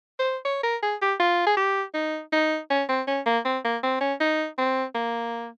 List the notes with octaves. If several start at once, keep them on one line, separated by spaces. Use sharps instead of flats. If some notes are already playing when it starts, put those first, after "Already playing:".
C5
C#5
A#4
G#4
G4
F4
G#4
G4
D#4
D#4
C#4
C4
C#4
A#3
C4
A#3
C4
C#4
D#4
C4
A#3